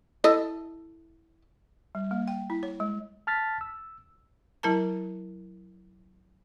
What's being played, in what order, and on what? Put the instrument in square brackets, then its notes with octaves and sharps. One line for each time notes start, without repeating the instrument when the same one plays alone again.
[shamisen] E4 A4 D#5
[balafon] G3
A#3
G5
E4
C#5
G#3
[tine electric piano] A5 F6 A6 B6
E6
[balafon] F#3 E4 A#4 A5 A#5